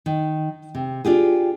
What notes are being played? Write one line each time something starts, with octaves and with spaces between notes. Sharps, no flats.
D#3
C3
D4 F4 G4 G#4